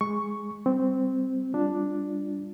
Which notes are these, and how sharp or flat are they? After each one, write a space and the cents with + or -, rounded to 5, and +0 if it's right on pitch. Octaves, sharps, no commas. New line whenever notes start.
G#3 +0 C#6 +0
G3 +0 C4 -5
G3 +10 D4 +0 F4 +0